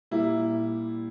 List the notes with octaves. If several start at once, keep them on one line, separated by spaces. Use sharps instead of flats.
A#2 G3 A#3 E4